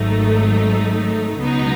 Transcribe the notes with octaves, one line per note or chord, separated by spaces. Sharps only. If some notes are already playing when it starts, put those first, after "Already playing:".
Already playing: G#1 G#2 F#3 A3 D#4
C#2 B2 F#3 B3 D#4